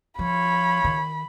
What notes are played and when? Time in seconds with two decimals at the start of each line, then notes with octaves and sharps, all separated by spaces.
0.19 F3 F4 C#5 B5
0.84 D#3